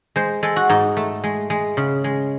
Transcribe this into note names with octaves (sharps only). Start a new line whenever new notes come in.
G#3 C5
G#3 A4
F#4
G#2 D#4
A3
G#3
G#3
C#3
G#3